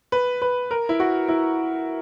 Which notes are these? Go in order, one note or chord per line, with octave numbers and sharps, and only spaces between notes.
B4
B4
A#4
E4
F#4
E4